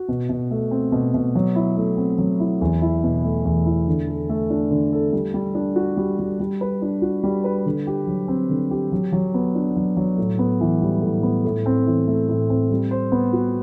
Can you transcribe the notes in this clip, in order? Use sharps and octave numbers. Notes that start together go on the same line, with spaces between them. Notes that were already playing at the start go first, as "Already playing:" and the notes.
Already playing: F#4
B2
B2
A3
C4
B2
B2
F#3
E4
A3
C4
F#3
E4
E2
E4
B2
A3
E2
E4
D3
A4
A3
D4
D3
A4
G3
G3
D4
F#4
G3
G3
G3
B4
D4
F#4
G3
B4
D3
G4
F#3
C4
D3
G4
F#3
F#3
B3
D4
F#3
F#3
A2
B3
E3
G3
A2
B3
A2
C4
E3
A3
A2
C4
G3
C5
B3
F#4